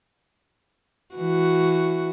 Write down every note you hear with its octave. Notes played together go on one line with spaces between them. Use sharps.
E3 F#4